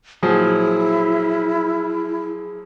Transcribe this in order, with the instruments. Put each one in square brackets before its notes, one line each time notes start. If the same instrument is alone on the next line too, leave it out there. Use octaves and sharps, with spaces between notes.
[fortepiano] A#2 F3 F#3 [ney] E4 [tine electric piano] G#4